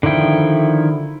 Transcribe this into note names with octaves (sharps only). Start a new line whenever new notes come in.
D3 D#3 F3 E4 G5